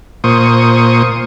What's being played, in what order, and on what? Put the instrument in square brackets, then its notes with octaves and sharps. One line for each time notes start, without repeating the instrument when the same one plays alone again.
[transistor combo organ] A#2 C5 C#6 D#6